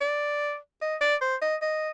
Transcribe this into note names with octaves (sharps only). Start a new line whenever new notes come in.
D5
D#5
D5
C5
D#5
D#5